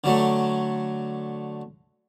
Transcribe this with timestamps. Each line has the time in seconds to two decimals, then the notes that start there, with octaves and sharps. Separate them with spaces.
0.04 D3 F#3 A3